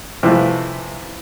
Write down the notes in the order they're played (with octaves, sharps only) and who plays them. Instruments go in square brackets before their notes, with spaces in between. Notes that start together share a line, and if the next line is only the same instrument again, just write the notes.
[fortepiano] C3 E3 F3 A3